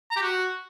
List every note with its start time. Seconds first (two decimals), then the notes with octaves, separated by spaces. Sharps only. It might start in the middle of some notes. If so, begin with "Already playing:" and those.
0.11 A#5
0.16 G4
0.22 F#4